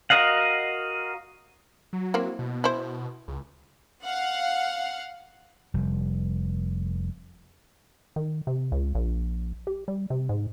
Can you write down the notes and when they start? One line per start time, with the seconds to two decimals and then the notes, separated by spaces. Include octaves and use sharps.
0.10 F#4 A#4 D#5 F5 F#5
1.93 F#3
2.14 A#3 C4 E4
2.39 B2
2.64 E4 C5
3.28 C#2
4.03 F5 F#5
5.74 F1 G3
8.16 D#3
8.47 C3
8.72 C#2
8.95 A#1
9.67 G4
9.88 G3
10.10 C3
10.29 G#2